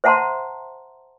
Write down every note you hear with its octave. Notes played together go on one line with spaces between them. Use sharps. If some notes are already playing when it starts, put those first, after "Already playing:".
C5 E5 F#5 A5 A#5 C6